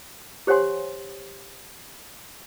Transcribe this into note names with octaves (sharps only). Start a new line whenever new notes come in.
G4 C5 C#5 F#5 G#5 C6